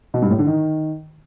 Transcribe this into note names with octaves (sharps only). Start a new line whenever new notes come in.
B2
G2
A2
D3
D#3